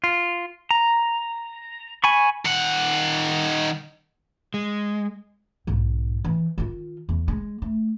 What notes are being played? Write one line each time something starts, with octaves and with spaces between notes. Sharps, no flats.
F4
A#5
G#5 B5 C#6
D#3 F#5
G#3
B1 G#2
E3
D#3 F4
E2
G#3
A3